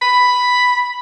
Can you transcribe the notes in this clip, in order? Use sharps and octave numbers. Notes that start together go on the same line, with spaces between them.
B5